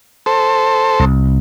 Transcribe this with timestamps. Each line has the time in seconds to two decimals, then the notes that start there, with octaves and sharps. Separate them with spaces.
0.26 A4 C5
1.00 C2